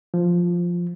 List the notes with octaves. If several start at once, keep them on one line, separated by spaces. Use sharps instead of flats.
F3